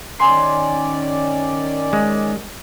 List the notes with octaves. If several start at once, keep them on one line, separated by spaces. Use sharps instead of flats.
D#3 C#4 D5 G#5 C6 C7
G#3